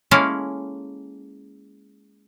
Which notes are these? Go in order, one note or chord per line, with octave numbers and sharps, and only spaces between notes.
G#3 A#3 C#4 E4 A4 F5